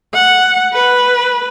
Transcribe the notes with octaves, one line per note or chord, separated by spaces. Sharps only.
F#5
B4